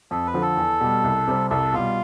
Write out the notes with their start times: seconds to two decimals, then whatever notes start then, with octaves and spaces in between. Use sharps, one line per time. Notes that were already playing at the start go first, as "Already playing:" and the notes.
0.11 F2 A4
0.26 B4
0.34 D3 F3
0.42 A4
0.57 E2
0.81 B2 G3
1.04 C2
1.28 C3 G3 C4
1.50 C2 A4
1.73 B2 G3 F4